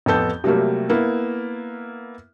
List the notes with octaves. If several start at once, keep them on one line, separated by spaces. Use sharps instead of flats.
A1 F2 B3 A4 G6
C3 F#3 G3 A3 A#3
A#3 B3 E4